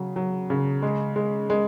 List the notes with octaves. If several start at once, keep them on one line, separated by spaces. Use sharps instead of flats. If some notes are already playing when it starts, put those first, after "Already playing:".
Already playing: C#3 F#3
F#3
C#3
G#3
G#3
G#3